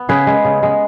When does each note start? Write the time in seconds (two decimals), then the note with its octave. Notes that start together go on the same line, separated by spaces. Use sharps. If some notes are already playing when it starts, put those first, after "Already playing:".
Already playing: B3
0.09 C#3 G#4 B4
0.27 G#3 B3
0.45 C#3
0.63 G#3 B3